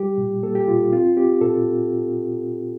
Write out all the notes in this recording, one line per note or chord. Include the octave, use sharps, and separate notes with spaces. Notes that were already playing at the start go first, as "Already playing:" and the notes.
Already playing: G3 G4
A#2
A#3 A4
G4
A#2 F4
C4 F4
C4 G4
A#2 A4